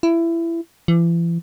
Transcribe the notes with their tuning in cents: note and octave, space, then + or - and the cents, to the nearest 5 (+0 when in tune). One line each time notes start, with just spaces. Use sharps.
E4 +20
E3 +40